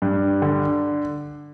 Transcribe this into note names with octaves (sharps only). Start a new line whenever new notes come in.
G2
D3